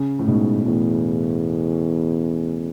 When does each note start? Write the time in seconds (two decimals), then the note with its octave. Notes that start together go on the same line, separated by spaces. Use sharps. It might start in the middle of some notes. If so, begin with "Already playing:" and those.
Already playing: C#3
0.19 A2
0.28 G#2 B2
0.66 E2 A2